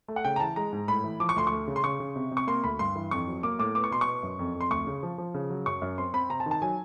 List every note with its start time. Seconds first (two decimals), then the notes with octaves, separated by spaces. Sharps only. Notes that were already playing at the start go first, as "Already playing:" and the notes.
0.08 A3
0.16 F#5
0.25 C#3 G5
0.36 A#5
0.40 E3 A5
0.56 G#3 A#5
0.73 G#2
0.88 A2 B5
1.04 E3
1.20 F3 D6
1.29 C#6
1.36 D2 C6
1.47 A3 C#6
1.68 C#3
1.76 C6
1.84 C#3 C#6
2.00 C#3
2.16 C3
2.31 C3
2.37 C#6
2.47 A#3 C6
2.64 D2 B5
2.79 G2 C6
2.96 E3
3.11 F2 C#6
3.28 F#3
3.43 A#3 D6
3.59 A2 D6
3.75 B3 D6
3.84 C#6
3.91 B2 C6
4.01 C#6
4.07 B3
4.23 F#2
4.39 F2
4.55 F2
4.61 C6
4.70 D2 C#6
4.87 C#3
5.03 F3
5.18 F3
5.34 C#3
5.50 F#3
5.66 F#2 C#6
5.82 F#2
5.98 C4 C6
6.14 C4 B5
6.30 C3 A#5
6.40 A5
6.46 D#3
6.51 A5
6.62 F#3 G#5